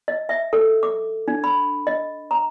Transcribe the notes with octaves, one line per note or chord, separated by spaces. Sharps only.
D#5
E5
A4
D6
D4
B5
D#5
A#5